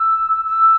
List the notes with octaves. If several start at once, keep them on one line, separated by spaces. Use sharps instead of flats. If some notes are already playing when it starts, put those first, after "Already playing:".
Already playing: E6
E6